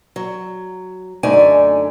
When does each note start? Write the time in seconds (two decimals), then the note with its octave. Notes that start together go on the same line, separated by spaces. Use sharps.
0.16 F#3
1.23 F#2 D3 A3 D#4 D5 G#5